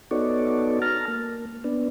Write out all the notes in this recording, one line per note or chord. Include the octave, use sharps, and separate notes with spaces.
B3 D#4 F#4 A4 C#5 D5
A5 A#5 F6
A#3
B3 D4